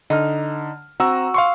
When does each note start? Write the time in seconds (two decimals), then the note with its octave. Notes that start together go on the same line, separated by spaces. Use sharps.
0.10 D3 D#4 F6
1.00 C4 F#4 A#5 E6
1.34 F5 C6 C#6